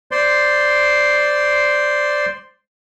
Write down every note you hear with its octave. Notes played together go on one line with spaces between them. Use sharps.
C5 D5 C6